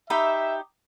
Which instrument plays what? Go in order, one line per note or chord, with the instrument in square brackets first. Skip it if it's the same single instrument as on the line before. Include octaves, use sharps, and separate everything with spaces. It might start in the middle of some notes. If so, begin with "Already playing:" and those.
[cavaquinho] D#4 G4 B5 [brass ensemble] E5